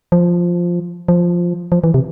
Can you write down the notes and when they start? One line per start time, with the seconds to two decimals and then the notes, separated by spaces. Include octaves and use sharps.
0.12 F3
1.08 F3
1.72 F3
1.84 E3
1.94 C3